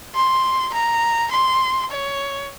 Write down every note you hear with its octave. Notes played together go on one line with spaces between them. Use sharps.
C6
A#5
C6
C#5